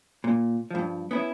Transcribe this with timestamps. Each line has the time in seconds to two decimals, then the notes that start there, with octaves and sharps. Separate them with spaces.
0.24 A#2
0.71 G2 F3
1.11 B3 C#4 E4